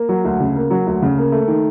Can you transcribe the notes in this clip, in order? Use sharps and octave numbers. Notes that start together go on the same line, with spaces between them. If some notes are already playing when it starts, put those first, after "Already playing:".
Already playing: A#3
F#3
D2
C#3
A#3
F#3
D2
C#3
A#3
A3
D#3